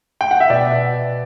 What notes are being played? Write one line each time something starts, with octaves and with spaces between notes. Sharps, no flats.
G5
F#5
E5
B2 D5